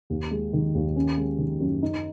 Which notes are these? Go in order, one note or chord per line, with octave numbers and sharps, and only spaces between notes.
D#2
G#3
D#3
D#2
C#4
G#3
D#3
F#2
D#4